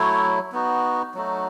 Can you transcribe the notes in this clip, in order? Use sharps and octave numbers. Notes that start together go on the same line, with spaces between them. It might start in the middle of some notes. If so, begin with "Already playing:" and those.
Already playing: F#3 A3 E4 C#5
B3 D#4 F#4
F#3 A3 D#4 F#4